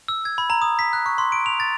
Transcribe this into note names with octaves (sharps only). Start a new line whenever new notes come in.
E6
G#6
B5
A#5
D#6
B6
F#6
C#6
C6
D7
F7
A6